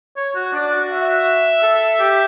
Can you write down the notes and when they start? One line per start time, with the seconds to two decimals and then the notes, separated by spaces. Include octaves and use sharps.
0.16 C#5
0.35 F#4
0.53 D4 D5
0.71 F#4
0.90 E5
1.62 A4
2.00 G4